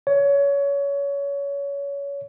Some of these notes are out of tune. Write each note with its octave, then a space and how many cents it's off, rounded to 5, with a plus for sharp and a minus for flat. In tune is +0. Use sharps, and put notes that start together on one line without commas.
C#5 +25